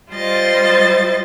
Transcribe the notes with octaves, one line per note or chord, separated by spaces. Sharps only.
G3 F4 C5 D#5 A6